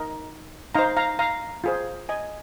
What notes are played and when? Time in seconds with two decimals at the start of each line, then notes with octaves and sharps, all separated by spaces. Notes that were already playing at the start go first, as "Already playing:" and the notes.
Already playing: D#4 A#4
0.75 D#4 C5 F5 A#5
0.97 F5 A#5
1.19 F5 A#5
1.64 F4 G#4 C5
2.09 D#5 G#5